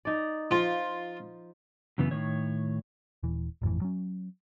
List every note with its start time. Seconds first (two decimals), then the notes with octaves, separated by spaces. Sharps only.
0.05 D#4 D5
0.51 F3 F4
1.98 F#2 C#3 E3 B3
2.11 A2 D#3 C#5
3.23 D#1 E3
3.62 G#1 F2 A2 E3
3.81 F#3 C#4